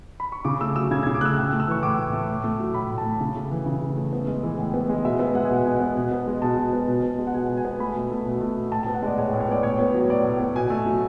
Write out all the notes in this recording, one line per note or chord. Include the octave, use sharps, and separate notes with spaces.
B5
C#6
C#3 D6
A3 E6
F#3 E6
C#3 G#6
C#3 G#6
D6
A3 E6 F#6
A2 F#6
A3
E6
E3 C#6
A2 D6
A2
A3
A2
A3
F#3
A2 B5
A2
A5
A3
C#3
A3
E3
C#3
C#3
A3
B3
G#3
E3
A2
B3
G#3
B2 E5
B3 E5
G#3 F#5
G#5
B2 F#5
B2
B3
B2
B3
G#3
B2 A5
B2
B3
B2
B3
G#3
F#5
B2 G#5
B2
G#5
B3
A3 B5
B2
A3
B2
A3
B2
A2 A5
B3 A5
F#5
G#3 D5
A2 C#5
A2
C#5
B3 D5
A2 C#5
B3
F#3
C#5
A2 D5
A2
B3
B2 G#5
A3
F#3